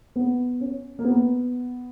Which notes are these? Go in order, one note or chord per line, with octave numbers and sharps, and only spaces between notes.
B3
C#4
A#3
B3